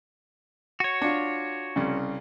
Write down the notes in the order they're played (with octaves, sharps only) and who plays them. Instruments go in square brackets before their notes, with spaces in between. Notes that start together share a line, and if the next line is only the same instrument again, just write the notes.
[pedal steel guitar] F#4 C#5
[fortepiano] D4 F4
C2 C#3